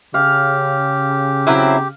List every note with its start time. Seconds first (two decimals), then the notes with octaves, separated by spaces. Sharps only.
0.14 C#3 G4 F5
1.47 F#3 C4 E4